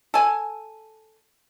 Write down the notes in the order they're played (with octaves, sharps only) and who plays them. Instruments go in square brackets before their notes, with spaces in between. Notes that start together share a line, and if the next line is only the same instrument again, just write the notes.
[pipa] A4 G#5